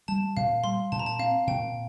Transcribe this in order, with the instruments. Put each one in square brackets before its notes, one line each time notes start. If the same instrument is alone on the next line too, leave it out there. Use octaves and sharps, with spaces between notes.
[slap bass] G3 [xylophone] A5
[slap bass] A#2 [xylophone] F5
[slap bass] G3 [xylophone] C6
[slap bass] A#2 [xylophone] A5
[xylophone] A#5
A5
[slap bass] C4 [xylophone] F5
[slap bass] A#2 [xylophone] G5